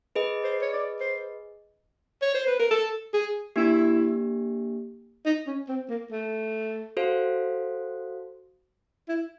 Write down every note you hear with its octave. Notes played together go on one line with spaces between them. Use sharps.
G#4 B4 D#5
C5
C#5
D5
C5
C#5
C5
B4
A#4
A4
G#4
A#3 D4 E4 G4
D#4
C#4
C4
A#3
A3
F#4 A4 C5 F5
E4